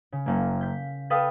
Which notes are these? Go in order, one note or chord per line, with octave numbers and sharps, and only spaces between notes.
C#3
F#1 A#3
G6 B6
A4 B4 F5 G5 D#6 E6